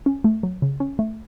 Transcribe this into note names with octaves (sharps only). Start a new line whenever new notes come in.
C#4
A3
F#3
C#3
C#4
A3